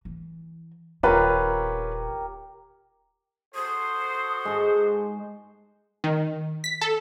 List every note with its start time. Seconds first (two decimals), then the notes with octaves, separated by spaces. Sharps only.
0.05 E3
1.03 D#1 D#3 C#4 F4 G4 A#4 B4
3.55 F#4 A4 C5 D#6
4.45 G#2 G#3
6.04 D#3
6.64 B6
6.81 A4